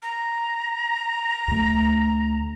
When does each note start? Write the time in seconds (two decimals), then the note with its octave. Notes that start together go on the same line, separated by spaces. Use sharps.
0.02 A#5
1.48 D2 A3